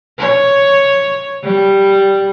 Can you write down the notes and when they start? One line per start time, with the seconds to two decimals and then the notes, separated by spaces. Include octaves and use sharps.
0.19 C#5
1.43 G3